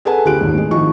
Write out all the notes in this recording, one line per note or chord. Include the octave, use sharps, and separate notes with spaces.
G#4 A4 B4 F#5 G#5 A5
D2 F4 G4 G#4 F#6 D7
D#2 G#2
A2 D#3 G#3
G#1 D#3 F3 E4 C#6